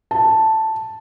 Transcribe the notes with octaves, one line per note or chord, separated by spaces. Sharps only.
A5